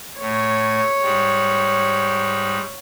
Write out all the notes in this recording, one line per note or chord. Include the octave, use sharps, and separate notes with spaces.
A2 C#5
G#2 G3